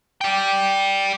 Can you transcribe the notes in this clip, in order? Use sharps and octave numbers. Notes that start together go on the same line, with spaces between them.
D5 G5